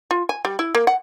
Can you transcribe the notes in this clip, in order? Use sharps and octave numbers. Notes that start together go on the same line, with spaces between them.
F4
G#5
G3
E4
A#3
F#5